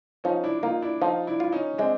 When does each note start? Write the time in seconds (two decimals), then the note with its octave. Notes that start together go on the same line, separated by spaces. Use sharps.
0.24 F3 C#4 D#4
0.44 D4 E4
0.59 E4
0.63 A#3 D#4 F4
0.82 D4 E4
1.01 F3 D#4 F4
1.27 D4 E4
1.40 E4 F4
1.52 C#4 D#4
1.78 G#3 C4 D4